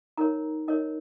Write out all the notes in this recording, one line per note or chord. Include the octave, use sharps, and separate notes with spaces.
D#4 A#4 C#5 A#5
D#4 A#4 C#5 D#5